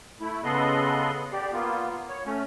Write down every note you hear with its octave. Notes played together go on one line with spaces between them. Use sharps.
A3 E4
C#3 B3 A4 D#5 C6 F#6
G4 D5
A#3 B3 F4
C#5
A3 C#4